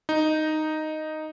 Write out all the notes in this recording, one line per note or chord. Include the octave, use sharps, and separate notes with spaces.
D#4